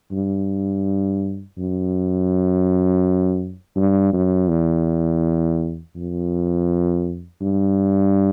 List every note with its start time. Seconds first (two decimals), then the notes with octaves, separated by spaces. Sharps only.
0.12 G2
1.58 F#2
3.76 G2
4.13 F#2
4.49 E2
5.96 F2
7.41 G2